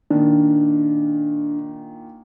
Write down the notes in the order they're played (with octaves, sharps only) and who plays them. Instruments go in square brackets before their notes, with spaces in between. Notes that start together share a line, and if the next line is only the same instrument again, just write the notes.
[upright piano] A#2 D#3 [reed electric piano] D4